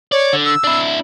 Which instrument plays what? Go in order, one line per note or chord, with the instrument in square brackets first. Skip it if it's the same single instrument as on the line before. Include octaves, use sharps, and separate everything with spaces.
[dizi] C#5 [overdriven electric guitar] D5
[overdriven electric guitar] D3
[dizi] E6
[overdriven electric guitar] D4 E4